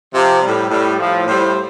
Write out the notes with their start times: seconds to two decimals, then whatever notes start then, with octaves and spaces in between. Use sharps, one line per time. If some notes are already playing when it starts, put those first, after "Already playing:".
0.13 C3 F3
0.41 G3
0.46 A2
0.70 A2 G3
0.99 A2 F3
1.27 A2 G3 C5